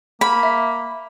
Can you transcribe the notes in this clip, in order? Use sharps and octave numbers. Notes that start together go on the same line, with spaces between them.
A#3 B5
E5